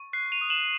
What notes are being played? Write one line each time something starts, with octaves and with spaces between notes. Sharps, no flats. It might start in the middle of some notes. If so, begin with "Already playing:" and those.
Already playing: C#6
F#6 C7
D#7 F7
D#6
E7 F#7